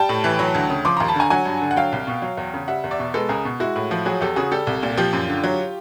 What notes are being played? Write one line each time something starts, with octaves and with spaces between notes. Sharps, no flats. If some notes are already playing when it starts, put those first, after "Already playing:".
Already playing: G3 G5 A5
A2
E3
F#3
D2
C#3
F3 C6 D6
D#2 A#5 C6
A5 B5
D3 G#5 A#5
F#3 F#5 G#5
G2
D3
F#5
F#3 F5 G5
C2
B2
F#3
E2
C#3
G3 E5 F#5
E2
D5 E5
B2
G#3 A4 B4
C#2 G#4 A#4
B2
G#3 E4 F#4
A2
F3
F#3 F#4 G#4
E2 G4 A4
C#3 F#4 G#4
G3 G4 A4
C2
A#2
F3 F4 G4
F#2
D3
F#3